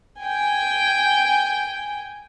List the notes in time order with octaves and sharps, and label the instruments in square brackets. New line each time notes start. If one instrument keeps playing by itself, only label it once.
[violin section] G5 G#5